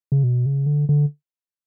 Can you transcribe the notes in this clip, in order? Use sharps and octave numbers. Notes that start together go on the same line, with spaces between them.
C#3
B2
C#3
D3
D3